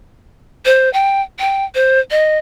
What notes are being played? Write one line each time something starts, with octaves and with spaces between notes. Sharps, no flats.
C5
G5
G5
C5
D#5